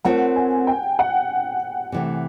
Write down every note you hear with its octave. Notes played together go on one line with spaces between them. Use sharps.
A3 C4 F4 A#4 C#5 F#5
G#5
G5
F#5
C3 E3 A3